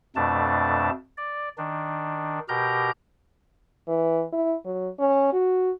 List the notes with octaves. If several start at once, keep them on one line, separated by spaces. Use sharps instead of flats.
F2 B2 A3 D4 A5
D5
D#3 D4
B2 G4 A#4 A#5 G6
E3
E4
F#3
C#4
F#4